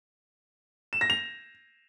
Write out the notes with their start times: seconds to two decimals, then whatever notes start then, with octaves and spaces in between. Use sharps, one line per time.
0.93 E7
1.01 A#6
1.10 F7